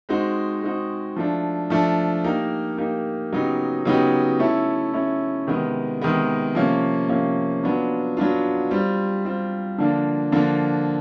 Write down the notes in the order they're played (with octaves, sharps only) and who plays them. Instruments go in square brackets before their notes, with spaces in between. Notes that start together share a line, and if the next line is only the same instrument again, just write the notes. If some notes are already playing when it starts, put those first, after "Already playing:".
[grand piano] G#3 C4 D#4 F#4
G#3 C4 D#4 F#4
F3 A3 D4
F3 A3 D4
A#3 D#4 G4 A#4
A#3 D#4 G4 A#4
C#3 F#3 B3 D#4 G4
C#3 F#3 B3 D#4 G4
A3 C#4 E4
A3 C#4 E4
C3 D#3 G#3 B3
C3 D#3 G#3 B3
C3 F3 A#3 C#4
C3 F3 A#3 C#4
F#3 B3 D4 F4
F#3 B3 D4 F4
G3 C4 F4
G3 C4 F4
D3 F3 A#3 D4 F4
D3 F3 A#3 D4 F4